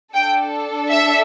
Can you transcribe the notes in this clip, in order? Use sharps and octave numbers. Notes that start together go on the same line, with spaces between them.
D4 A4 G5
E5